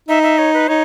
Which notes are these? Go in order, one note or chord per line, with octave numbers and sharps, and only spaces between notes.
D#4 E5
E5
C#5
B4
D#4 C#5